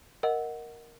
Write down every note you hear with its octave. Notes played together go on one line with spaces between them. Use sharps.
A#4 D#5 F#5